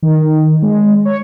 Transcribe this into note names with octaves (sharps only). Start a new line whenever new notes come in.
D#3
G#3
C#5